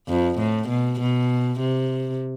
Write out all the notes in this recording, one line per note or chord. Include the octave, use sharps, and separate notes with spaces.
F2
A2
B2
B2
C3